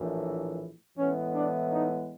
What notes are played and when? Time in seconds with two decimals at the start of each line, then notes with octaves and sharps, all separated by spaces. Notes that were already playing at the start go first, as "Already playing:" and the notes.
Already playing: A#1 A2 E3
0.96 A2 E3 G#3 B3 C#4
1.33 D4
1.71 D#4